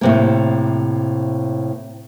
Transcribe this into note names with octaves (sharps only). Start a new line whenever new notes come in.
A2 C3 A#3